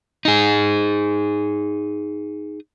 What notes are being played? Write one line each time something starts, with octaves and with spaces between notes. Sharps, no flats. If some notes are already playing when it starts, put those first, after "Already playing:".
D#4 G#4